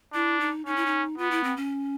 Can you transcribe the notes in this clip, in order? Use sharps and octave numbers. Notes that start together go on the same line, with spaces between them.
D4 E4
D#4
C#4 D#4
E4
D#4
B3 F4
E4
C4
C#4